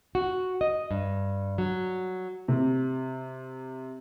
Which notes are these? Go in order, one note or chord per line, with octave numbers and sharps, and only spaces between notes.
F#4
D#5
G2
F#3
C3